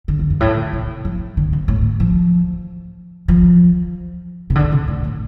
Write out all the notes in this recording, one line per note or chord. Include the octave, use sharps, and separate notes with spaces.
D3
F2
G2
A2
C3
F3
D3
C3
A2
F3
F3
C3
D3
C3
A2
A2